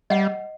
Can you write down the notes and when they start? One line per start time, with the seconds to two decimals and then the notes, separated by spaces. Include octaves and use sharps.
0.10 G3 D#5 F#5